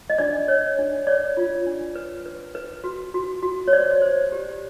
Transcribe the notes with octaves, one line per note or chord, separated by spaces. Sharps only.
D#5
D4 D5
C#5
D4
C#5 D5
F4
D4
B4
B4
B4
F#4
F#4
F#4
C#5
C5 D5
C5
G4